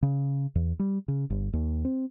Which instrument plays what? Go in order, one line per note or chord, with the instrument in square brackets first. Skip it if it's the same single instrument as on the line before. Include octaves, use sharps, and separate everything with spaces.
[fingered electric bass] C#3
E2
G3
C#3
G1
D#2
C4